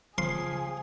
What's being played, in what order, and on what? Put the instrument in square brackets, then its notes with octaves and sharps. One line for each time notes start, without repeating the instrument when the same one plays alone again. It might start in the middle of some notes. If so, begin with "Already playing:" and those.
[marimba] C#3 [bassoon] F3 [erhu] G#4 [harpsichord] C6